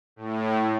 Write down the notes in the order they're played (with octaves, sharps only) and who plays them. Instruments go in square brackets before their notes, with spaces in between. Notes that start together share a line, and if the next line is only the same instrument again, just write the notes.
[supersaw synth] A2